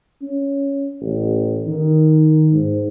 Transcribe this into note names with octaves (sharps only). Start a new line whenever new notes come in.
C#4
A1
D#3
G#2